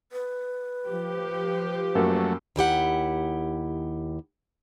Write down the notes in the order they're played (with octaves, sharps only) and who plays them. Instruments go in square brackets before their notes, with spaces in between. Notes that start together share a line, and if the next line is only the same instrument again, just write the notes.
[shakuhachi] B4
[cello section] F3 G4
[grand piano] F#2 A#3 [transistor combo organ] F#3 A3
[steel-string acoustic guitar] D#2 E4 G4 F#5